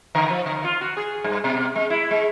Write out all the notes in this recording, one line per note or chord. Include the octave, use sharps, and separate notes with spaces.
D3
F3
D3
F4
F#4
G#4
G2
B2
G#3
E4
G#3